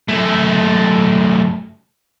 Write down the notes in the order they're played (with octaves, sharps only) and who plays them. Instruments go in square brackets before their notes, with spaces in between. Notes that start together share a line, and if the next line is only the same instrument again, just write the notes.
[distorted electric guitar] F#2 A3